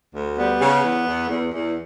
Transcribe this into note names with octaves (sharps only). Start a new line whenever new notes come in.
D2
G3 B3
C#3
E2
E2
E2
E2